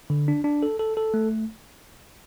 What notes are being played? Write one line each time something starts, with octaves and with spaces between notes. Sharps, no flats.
D3
D4
D4
A4
A4
A4
A3